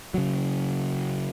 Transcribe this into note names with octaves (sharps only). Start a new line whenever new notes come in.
C#3 F#3